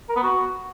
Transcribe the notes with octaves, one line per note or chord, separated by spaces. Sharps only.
A#4
B3
F#4